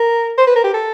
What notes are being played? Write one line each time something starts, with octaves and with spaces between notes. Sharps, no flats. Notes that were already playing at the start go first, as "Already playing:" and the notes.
Already playing: A#4
C5
B4
A#4
G4
A4